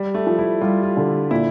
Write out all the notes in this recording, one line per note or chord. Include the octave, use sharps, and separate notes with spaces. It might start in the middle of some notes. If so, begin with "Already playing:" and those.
Already playing: G3
A3
F3
E4
G3 F4
F4
D3
A#2 E4